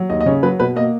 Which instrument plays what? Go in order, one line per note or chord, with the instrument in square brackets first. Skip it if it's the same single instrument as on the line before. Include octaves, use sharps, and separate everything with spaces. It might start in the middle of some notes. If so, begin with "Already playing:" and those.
Already playing: [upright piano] F#3
D#2 D#5
D#5
C#3 C#5
F#3 B4
B2 B4
A#3 D#5